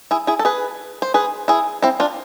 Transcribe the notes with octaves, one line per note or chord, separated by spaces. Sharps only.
E4 G#4
E4 G#4
A4
G#4 B4
C5
G#4 B4
E4 G#4
C4 E4
D4 F4